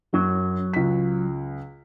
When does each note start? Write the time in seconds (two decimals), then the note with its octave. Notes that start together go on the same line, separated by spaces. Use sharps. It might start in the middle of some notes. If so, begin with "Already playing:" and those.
0.14 F#2 F#3
0.74 C#2 B6